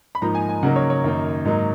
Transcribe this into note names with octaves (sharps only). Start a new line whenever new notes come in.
B5
G#2 F3 A#3 D#4 A#5
G#5
G#5
C#3 F#3 A#3 D#4 F#5
C#5
C#5
F#2 D#3 A#3 D#4
G#2 F#3 A#3 D#4